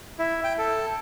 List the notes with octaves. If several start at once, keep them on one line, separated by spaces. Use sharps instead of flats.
E4
G5
A4